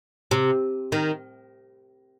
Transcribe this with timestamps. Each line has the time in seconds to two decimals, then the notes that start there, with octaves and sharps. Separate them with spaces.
0.31 C3
0.92 D#3